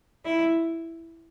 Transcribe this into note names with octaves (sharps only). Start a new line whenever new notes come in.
E4